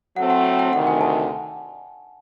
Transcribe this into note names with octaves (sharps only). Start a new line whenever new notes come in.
A2 F#3 A3 C4 F#5
F#5
G5
G5
D2 C3 D#3 F#5
G#5
A5